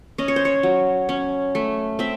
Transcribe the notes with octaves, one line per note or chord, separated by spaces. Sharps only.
C#4 D#5
C#5
C5
C#5
F#3
C#4
A3
C4 E5